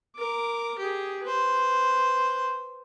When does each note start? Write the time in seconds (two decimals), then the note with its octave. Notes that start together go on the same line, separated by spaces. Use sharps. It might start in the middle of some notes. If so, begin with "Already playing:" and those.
0.16 A#4 D6
0.79 G4 G#4
1.23 B4 C5